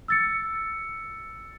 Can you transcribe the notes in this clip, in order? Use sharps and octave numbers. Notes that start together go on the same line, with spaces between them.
E6 A6 C#7